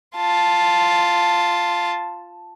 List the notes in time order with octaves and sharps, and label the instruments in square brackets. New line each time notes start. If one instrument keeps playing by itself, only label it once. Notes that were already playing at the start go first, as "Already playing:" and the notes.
[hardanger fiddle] F4 A5